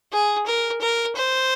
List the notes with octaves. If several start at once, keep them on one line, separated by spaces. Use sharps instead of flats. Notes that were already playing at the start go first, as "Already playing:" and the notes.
G#4
A#4
A#4
C5